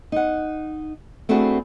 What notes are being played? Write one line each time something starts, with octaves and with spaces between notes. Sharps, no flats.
D#4 F#5
A3 C4 D4 E4 F#4 G#4